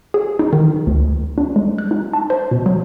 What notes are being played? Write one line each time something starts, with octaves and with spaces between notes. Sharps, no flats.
G#4
D#4
D#3
D2
D4
G#3
F#6
D#4
A5
C5
B2
F#3